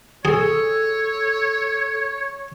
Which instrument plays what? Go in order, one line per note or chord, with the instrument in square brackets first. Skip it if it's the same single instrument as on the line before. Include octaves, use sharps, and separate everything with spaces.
[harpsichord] G#4 [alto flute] A4 [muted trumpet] C#5